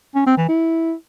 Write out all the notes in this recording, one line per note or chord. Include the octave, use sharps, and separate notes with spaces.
C#4
C4
E3
E4